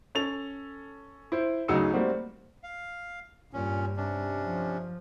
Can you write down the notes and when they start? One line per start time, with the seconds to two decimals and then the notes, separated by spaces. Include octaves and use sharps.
0.15 C#4 A4 A6 F7
1.32 E4 C5
1.68 D2 C#3 F#3 D#4 E6 C#7
1.93 G3 A3 A#3 C4 F#4
2.63 F5
3.53 G2 A#2 C#4
3.97 C3 C#4 D4
4.42 F3